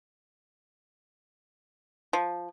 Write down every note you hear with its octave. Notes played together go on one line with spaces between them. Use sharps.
F3